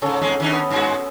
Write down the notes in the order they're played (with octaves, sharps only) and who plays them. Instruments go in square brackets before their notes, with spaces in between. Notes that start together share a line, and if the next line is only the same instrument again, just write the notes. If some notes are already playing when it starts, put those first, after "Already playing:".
[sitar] G#2 C#3 [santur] C#4 A4
[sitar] E2 G#2 G#3
D#3 C#4 D4
[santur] B3
[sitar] G2 G#3 F#4